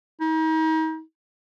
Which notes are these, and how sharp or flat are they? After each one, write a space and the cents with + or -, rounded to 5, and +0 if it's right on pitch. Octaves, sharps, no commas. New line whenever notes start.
D#4 +35